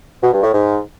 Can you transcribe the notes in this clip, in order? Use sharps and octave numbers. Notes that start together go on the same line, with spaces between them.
B2
G2
A2
G#2